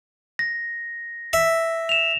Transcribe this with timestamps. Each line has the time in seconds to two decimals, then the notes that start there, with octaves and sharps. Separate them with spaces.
0.39 A#6
1.33 E5
1.89 E7 F7